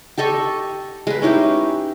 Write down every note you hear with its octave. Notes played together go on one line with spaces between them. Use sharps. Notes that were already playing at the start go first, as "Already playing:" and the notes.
G4 A4 D#5 C#6
G#3 B4
C#4 D#4 E4 G4